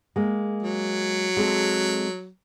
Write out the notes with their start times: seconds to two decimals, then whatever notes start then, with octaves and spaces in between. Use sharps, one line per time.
0.16 G#3 A#3
0.62 F#3
1.37 G#3 C4 A4